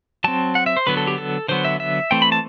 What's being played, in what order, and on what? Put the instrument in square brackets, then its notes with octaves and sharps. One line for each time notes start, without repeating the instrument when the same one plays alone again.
[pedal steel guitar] F#3 C4 A5
F#5
E5
C5
D3 F#3 B3 B4
A4
G4
A4
D3 F#3 B3 C5
E5
E5
E3 A3 C4 G5
B5
A5